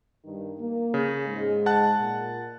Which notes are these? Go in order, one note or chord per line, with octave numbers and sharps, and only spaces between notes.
G2 D#3
A#3
C#3
G#2 G#3
F#5 A5 F#6
A#2